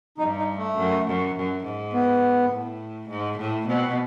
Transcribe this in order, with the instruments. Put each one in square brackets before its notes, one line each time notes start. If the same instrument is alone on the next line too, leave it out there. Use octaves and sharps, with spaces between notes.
[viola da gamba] G2 [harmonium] D#4
[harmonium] D#4
A3
[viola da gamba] F#2
F#2
F#2
G#2
[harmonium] B3
[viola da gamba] A2
G#2
A2
[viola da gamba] B2 [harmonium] C4